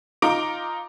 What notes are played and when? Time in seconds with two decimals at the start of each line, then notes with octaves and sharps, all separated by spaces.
0.22 D#4 F4 A#5 D6 D7